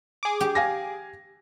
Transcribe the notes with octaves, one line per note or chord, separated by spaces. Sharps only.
G#4 D6
G4
F5 G#5 A#6